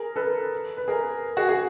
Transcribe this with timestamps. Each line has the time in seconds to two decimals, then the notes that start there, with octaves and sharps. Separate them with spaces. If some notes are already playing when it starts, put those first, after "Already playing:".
Already playing: G#4 A#4
0.16 A4 B4
0.77 B4
0.88 G#4 A#4
1.37 F#4 G#4
1.48 F#4 G#4